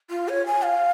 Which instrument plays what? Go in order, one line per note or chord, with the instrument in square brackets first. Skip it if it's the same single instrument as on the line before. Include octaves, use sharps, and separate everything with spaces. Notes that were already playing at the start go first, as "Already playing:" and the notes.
[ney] F4
C#5
G#5
F5